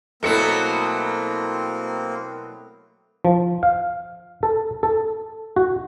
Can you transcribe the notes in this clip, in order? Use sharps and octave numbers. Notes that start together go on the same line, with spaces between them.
B2 F#3 A3 A#3 C4 E4 C#7
F3
F5
A4
A4
F#4